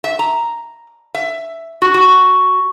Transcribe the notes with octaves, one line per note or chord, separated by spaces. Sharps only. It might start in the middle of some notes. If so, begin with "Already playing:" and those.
E5
A#5
E5
F#4
F#4